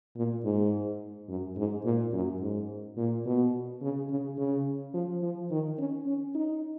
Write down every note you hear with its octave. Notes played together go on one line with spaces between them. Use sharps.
A#2
G#2
F#2
G#2
A#2
F#2
G#2
A#2
B2
C#3
C#3
C#3
F3
F3
D#3
C#4
C#4
D#4